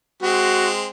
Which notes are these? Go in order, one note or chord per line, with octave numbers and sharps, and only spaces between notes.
G#3 C4 F#4